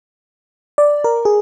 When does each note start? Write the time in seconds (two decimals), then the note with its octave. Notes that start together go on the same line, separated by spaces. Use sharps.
0.78 D5
1.04 A#4
1.25 G#4